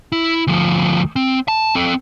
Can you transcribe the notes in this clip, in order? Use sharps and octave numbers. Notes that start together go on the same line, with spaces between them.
E4
D2 F3
C4
A5
C4 A4